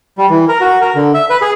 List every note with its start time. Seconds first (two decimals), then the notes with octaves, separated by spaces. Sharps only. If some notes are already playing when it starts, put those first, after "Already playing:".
0.18 G3
0.30 E3
0.48 A#4
0.61 F#4
0.81 A#4
0.95 D3
1.14 E5
1.30 B4
1.42 G#4